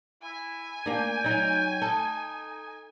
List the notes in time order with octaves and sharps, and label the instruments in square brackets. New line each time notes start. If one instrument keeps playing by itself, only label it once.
[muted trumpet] E4 [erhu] G#5
[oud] A#3 D4 [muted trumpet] G5
[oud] F#3 D#4
[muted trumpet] D#4 [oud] A4